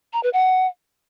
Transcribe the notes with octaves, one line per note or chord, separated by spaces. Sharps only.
A#5
B4
F#5